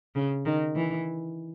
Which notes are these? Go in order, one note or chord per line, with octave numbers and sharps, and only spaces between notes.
C#3
D#3
E3